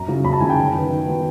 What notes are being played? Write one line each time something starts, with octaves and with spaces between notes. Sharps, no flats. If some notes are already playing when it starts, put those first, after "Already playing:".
Already playing: F#2 A#5
C#3 F#3
F#2 B5
A5
C#3 F#3 G#5
G5
D#3
F#3 B3
D#3
F#3 B3